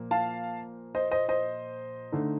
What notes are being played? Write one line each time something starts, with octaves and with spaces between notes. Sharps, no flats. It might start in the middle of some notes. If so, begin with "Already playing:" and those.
Already playing: A#2 F3 A#3
F5 A5
C5 D#5
C5 D#5
C5 D#5
D3 A3 D#4